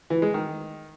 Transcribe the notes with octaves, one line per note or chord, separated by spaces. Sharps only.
E3
G#3
D#3